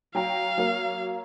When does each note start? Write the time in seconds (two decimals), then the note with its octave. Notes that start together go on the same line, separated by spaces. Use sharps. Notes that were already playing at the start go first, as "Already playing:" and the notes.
0.15 F#3 F5 G5 A#5
0.58 F#3 A#3